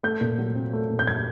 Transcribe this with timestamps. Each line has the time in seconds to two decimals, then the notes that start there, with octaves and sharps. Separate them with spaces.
0.03 A3 G6
0.21 A#2
0.38 F#3
0.55 C4
0.73 A3
0.90 A#2
0.99 G6
1.07 F#3 G#6